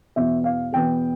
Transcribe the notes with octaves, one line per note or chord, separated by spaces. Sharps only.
E2 B2 B3 E5
F5
E2 B2 B3 G5